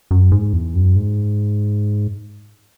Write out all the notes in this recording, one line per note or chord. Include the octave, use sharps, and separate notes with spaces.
F#2
G#2
E2
F#2
G#2